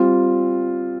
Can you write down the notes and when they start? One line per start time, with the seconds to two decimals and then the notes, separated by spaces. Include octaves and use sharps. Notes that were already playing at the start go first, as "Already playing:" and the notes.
Already playing: G3 C4 F4